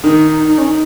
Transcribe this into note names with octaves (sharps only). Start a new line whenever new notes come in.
D#3
D#4
D#4
C#4
D#4